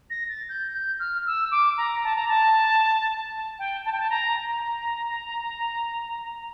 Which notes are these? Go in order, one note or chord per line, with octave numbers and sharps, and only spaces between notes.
A#6
A6
G6
G6
F6
E6
D6
A#5
A5
A#5
A5
G5
A5
G5
A5
A#5
A#5